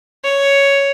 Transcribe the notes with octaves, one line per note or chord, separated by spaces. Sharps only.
C#5